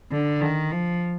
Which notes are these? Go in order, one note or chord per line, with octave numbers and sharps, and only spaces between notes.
D3
D#3
F3